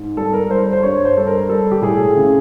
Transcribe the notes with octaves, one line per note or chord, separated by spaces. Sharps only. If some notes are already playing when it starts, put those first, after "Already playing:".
Already playing: G#2
G3 A4
A#4
G3 C5
C5
G2 C#5
C5
G3 A4
A#4
G3 A4
G4
A2 G#4
C#3